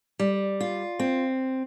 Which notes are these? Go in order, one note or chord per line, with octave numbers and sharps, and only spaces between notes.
G3
F4
C4